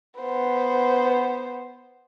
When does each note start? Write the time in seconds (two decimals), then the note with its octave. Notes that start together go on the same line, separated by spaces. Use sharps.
0.20 B3 C5